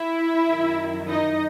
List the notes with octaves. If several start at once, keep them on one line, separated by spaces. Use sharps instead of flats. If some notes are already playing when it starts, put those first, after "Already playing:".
Already playing: E4 E5
F#2 D#3 F#3
D#4 D#5